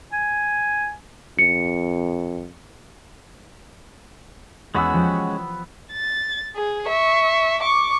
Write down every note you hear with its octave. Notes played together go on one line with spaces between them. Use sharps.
G#5
F2 C#7
E2 G#3 B3 C#4 F#4 B5 E6
F3 G4
A6
G#4
E5 C#6
C#6 D6